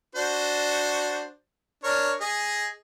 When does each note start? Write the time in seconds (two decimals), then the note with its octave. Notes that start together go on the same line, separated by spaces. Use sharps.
0.15 D4 F#4 C5
1.84 D4 A#4 C#5
2.20 G#4 D#5